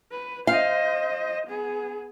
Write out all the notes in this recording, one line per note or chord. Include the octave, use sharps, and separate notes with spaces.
B4
C5 D#5 F5
B3 G#4